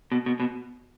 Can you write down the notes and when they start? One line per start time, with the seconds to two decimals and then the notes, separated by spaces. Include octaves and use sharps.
0.12 B2
0.26 B2
0.40 B2